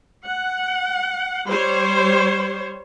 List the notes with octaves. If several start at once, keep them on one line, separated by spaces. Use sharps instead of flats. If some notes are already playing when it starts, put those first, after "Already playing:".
F#5
G3 C5 C#5